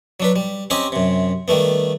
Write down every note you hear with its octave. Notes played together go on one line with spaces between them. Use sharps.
F#3 D4 B4
G3
C4 C#4 G4 D#5 G5 A#5
F#2 C3
D#3 G3 A3 B3